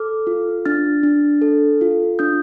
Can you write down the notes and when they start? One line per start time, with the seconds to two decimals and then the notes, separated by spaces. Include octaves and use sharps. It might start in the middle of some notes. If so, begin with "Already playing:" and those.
Already playing: A4 D6 F6
0.27 F4
0.66 D4 F6 A6
1.03 D4
1.42 A4
1.81 F4
2.19 D4 D#6 G6